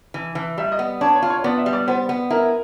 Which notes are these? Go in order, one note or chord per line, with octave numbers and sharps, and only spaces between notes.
E3
E3
G3 E5
D#5
B3
D4 C#5
C#5
F4
C#5
B3 D5
E5
G3
D5
B3 C5
B3
E4 A#4